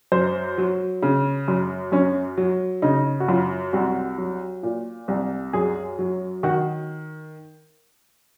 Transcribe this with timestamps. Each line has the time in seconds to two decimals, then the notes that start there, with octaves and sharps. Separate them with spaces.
0.12 F#2 C5
0.58 F#3
1.03 C#3
1.48 F#2
1.92 F#2 C#4
2.37 F#3
2.82 C#3 D#4
3.20 F#4
3.28 F#2 F4
3.73 C2 F#4
4.18 F#3
4.63 A#2
5.08 C2
5.53 F#2 G#4
5.99 F#3
6.43 D#3 F#4